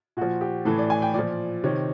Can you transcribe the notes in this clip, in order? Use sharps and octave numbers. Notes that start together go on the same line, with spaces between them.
A#2 F3 F#4
G4
A2 E3 A4
D5
G#5
G5
A#2 F3 D5
C3 D#3 C#5